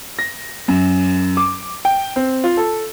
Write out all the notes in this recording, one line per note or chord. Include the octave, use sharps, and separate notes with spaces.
A#6
F#2
D6
G5
C4
F4
A4